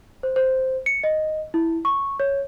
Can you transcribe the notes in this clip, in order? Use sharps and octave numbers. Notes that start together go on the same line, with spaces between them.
C5
C5
C#7
D#5
E4
C#6
C#5